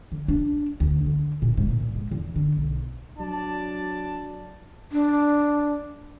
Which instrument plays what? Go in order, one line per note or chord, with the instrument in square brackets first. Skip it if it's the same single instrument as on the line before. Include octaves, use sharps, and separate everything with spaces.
[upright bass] D3
D4
D2
D3
A#2
G#2
A#2
G#2
E2
D3
B1
[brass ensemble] F#3 D4 D5 A5
[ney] D4